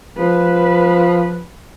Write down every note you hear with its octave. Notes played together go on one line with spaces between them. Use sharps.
F3 B4